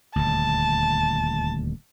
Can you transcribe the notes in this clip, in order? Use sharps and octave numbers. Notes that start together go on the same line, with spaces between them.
D#1 D2 A5